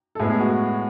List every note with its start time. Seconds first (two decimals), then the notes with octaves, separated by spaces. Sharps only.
0.15 A4
0.19 A2 G#3 B3 G#4
0.30 G#4
0.40 F#4